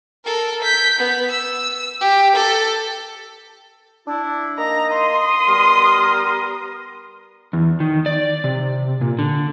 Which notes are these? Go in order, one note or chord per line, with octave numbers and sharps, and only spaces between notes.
A4 A#4
G6 B6
B3
E6
G4
A4
D4 E4
A#3 D#4 D#5 A#5
C6 D#6
G3 B3 A#4
E2
D#3
D5
C3
A#2
D3